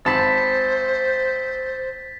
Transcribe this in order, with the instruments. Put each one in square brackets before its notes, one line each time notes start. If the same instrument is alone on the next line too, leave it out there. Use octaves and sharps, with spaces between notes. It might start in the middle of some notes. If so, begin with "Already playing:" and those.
[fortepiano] G#1 A5 B5 [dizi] C5 [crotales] A6 B6